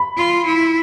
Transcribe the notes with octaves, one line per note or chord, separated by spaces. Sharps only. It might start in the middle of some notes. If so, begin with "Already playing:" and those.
Already playing: B5
F4
E4